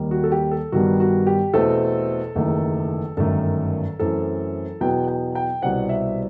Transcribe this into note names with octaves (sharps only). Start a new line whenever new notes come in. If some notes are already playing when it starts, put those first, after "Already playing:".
Already playing: D#2 D#3 G3
F#4
A4
G4
A4
G2 D#3 G3 B3 F#4
F#4
G4
E2 B2 A3 C4 A4
F#1 E2 D#3 A3
G1 F#2 D#3 A3 A4
F#2 E3 A3 C4 A4
E2 B2 F#3 B3 G5
G5
G5
C2 B2 G3 C4 F#5
E5